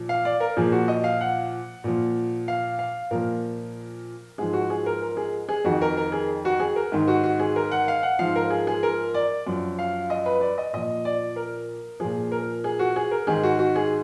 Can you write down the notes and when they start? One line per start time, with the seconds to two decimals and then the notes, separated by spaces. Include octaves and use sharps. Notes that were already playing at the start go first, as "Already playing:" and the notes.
Already playing: A#2 F3
0.09 F5
0.25 D5
0.40 A#4
0.57 A#2 F3 G#4
0.72 F#4
0.88 D#5
1.04 F5
1.21 F#5
1.84 A#2 F3
2.48 F5
2.79 F5
3.11 A#2 F3 A#4
4.38 G#2 F3 G#4
4.53 F#4
4.70 G#4
4.86 A#4
5.02 A#4
5.17 G#4
5.49 G#4
5.64 F2 D#3 F#4
5.82 A#4
5.97 A#4
6.12 G#4
6.45 F#4
6.60 G#4
6.76 A#4
6.92 G#2 D#3
7.08 F#4
7.24 F#4
7.39 G#4
7.56 A#4
7.72 F#5
7.88 F5
8.03 F#5
8.19 G#2 F3 F5
8.36 A#4
8.50 G#4
8.67 G#4
8.83 A#4
9.14 D5
9.47 F#2 F3
9.79 F5
10.10 D#5
10.26 B4
10.41 D5
10.58 D#5
10.73 A#2 F3 D#5
11.05 D5
11.36 A#4
12.00 A#2 F3 G#4
12.32 A#4
12.64 G#4
12.79 F#4
12.96 G#4
13.11 A#4
13.27 G#2 D#3 G#4
13.43 F#4
13.59 F#4
13.76 G#4